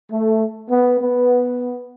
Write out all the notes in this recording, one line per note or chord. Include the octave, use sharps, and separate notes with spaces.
A3
B3
B3